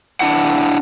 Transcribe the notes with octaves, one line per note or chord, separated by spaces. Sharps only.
D4 E4 F#5